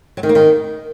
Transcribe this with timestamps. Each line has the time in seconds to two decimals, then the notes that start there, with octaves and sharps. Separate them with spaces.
0.17 F#3
0.23 D#3
0.29 A#3
0.35 D#3